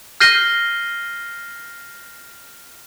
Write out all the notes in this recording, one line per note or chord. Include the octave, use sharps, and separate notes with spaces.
F6 G6 A#6 C7 D#7 G7